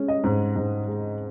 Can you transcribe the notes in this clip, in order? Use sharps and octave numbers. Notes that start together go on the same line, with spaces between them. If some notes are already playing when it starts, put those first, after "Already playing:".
Already playing: G#3 C#4
D#5
G#2
G#2
G#3